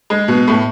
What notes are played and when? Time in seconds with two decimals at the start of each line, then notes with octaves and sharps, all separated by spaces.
0.10 G#3
0.28 B2
0.48 A2